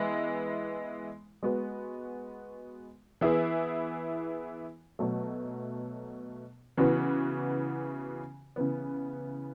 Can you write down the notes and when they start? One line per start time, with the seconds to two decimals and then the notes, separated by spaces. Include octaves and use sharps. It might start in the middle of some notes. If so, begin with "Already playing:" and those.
Already playing: E3 G#3 B3 E4
1.43 G#3 B3 F#4
3.21 E3 B3 E4 G#4
4.99 B2 F#3 A3
6.77 C#3 E3 B3 F#4
8.56 C#3 E3 B3